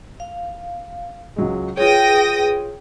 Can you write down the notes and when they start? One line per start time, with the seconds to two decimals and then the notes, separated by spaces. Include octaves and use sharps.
0.20 F5
1.36 C#2 F#3 G#3
1.77 F4 G#4 B4 C#5 G5 D#6 A#6